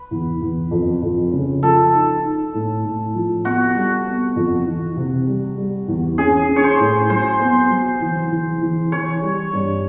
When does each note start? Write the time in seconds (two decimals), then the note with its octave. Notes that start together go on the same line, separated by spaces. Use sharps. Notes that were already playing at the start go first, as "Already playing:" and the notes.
Already playing: B4
0.11 E2
0.41 E2
0.71 F2
1.02 F2
1.32 C#3
1.63 F3 A4
1.93 D#4
2.24 D#4
2.54 A2
2.84 A2
3.14 F3
3.45 B3 F#4
3.75 G3
4.06 B3
4.36 F2
4.66 E3
4.97 C3
5.27 G3
5.58 G3
5.88 E2
6.18 C#4 G#4
6.49 C#4
6.56 C#5
6.64 C5
6.79 A2
7.10 F#3 C5
7.40 B3
7.70 F#3
8.01 E3
8.31 E3
8.61 E3
8.92 E3 C#5
9.22 G3
9.53 G2